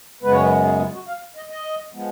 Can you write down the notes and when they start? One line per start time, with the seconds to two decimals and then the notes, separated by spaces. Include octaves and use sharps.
0.22 F#2 C#3 G#3 B3 B4
0.32 C#5
0.40 B4
0.65 G#4
0.79 F4
0.94 F#4
1.08 F5
1.36 D#5
1.50 D#5
1.93 F3 G#3 B3